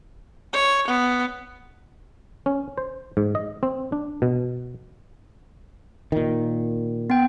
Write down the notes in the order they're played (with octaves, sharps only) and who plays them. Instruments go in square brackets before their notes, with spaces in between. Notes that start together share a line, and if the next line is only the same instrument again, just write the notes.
[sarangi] C#5
B3
[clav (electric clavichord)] C#4
C5
G#2
D#5
C4
D4
B2
[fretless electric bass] A#2 D#3
[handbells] B3 G5